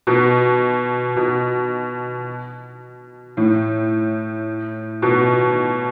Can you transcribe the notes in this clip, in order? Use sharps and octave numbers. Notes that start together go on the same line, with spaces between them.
B2
B2
A2
B2